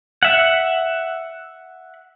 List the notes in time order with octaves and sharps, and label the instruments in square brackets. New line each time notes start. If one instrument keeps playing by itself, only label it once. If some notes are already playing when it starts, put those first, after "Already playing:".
[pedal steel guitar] E5 F#5